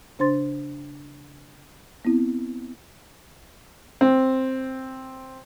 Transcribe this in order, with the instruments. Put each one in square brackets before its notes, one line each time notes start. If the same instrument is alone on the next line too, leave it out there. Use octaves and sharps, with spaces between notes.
[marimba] C#3 D4 C5 C6 A6
B3 C4 E4
[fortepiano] C4